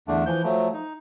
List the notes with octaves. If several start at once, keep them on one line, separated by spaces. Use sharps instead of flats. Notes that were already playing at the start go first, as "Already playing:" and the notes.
E2 D3 A3 D4
E3 F3 G6
F3 F#3 A3
D#4